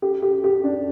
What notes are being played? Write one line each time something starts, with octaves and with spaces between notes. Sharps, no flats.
G4
G4
G4
D4